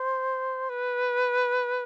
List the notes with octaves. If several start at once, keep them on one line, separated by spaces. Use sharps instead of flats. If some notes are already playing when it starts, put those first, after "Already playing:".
Already playing: C5
B4